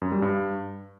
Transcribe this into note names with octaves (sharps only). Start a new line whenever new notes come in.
F#2
G3
G2